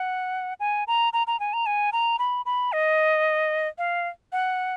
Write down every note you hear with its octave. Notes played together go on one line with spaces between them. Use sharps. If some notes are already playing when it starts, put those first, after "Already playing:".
Already playing: F#5
G#5
A#5
A#5
A#5
G#5
A#5
G#5
A#5
B5
B5
D#5
F5
F#5